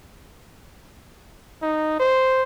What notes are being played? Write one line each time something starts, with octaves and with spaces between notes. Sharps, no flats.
D#4
C5